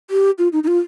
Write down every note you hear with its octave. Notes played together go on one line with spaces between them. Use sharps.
G4
F4
D#4
D#4
F4